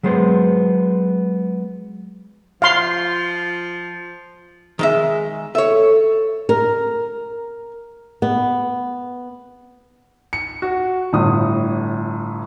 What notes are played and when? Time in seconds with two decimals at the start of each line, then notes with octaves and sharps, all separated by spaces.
0.03 F#3 G#3 B3 C5
2.62 F3 F5 C6
4.79 D#3 G#3 E5
5.55 A4 C#5 E5
6.49 A#4
8.22 B3
10.33 C#7
10.62 F#4
11.13 G1 A2 D#6